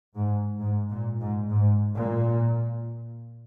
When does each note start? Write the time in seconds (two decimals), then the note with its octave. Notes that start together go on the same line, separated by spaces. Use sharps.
0.16 G#2
0.60 G#2
0.90 A#2
1.21 G#2
1.50 G#2
1.95 A#2